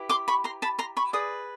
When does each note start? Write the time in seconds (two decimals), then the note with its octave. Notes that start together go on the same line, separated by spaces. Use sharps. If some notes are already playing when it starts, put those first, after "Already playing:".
Already playing: E4 G4 B4
0.09 C6 D6
0.28 B5 C#6
0.44 A#5 C6
0.62 A5 B5
0.79 A#5 C6
0.97 B5 C#6
1.13 G#4 B4 D5 D#6